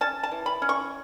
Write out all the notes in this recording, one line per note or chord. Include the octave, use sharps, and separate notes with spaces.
C#4 A5
A5
E3
B5
C#4
C#6